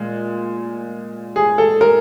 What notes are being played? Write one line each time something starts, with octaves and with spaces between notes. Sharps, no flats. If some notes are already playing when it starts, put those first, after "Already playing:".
Already playing: A#2 G#3
G#4
A4
A#4